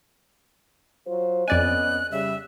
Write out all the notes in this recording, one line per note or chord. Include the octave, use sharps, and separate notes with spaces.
F#3 F4 C5
F2 B3 C#4 D5 D#5 G#5 F#6
C#3 G3 E5